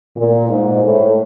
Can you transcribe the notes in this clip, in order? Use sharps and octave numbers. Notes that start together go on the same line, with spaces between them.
A#2
G#2
A2